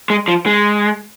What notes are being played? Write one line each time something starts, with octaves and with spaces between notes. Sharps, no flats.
G#3
F3
G#3